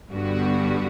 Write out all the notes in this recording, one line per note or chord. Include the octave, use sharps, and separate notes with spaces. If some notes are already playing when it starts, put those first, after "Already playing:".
G2 D3 G3 B3 F#4